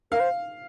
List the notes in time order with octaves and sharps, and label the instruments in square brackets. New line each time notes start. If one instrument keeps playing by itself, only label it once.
[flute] A#4 [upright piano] F5
[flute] C5